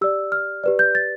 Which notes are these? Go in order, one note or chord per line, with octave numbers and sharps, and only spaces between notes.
G4 D5 E6
F6
G4 B4 D5
G6
A6